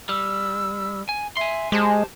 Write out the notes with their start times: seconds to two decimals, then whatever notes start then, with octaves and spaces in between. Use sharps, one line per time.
0.09 G3 E6
1.09 G#5
1.37 E5 G#5 C6
1.72 G#3 G4 C5 A5